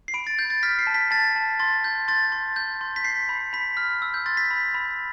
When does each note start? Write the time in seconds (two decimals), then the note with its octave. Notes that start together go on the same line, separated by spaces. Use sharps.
0.08 C7
0.14 B5 D7
0.27 A6
0.39 G6
0.50 A6
0.63 F6 B6
0.79 C7
0.87 A5
0.94 B6
1.11 A5 A6
1.36 A5
1.59 C6 A6
1.84 G6
2.08 C6 A6
2.32 C6
2.56 G6
2.81 C6
2.96 B6
3.04 G6 C7
3.29 B5
3.53 B5 B6
3.77 F6
4.02 E6
4.14 G6
4.26 C6 A6
4.37 B6
4.51 B5
4.74 B5